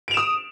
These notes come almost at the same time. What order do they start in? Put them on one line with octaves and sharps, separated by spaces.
D7 F7 E7 D#6